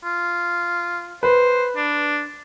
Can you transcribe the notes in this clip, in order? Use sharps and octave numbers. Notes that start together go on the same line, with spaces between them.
F4
B4 C5
D4